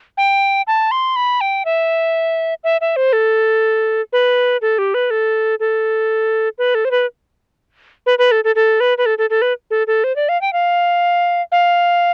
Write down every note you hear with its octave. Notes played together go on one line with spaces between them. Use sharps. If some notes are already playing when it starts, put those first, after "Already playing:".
G5
A5
C6
B5
G5
E5
E5
E5
C5
A4
B4
A4
G4
B4
A4
A4
B4
A4
C5
B4
B4
B4
A4
A4
A4
B4
B4
A4
A4
A4
B4
A4
A4
C5
D5
F5
G5
F5
F5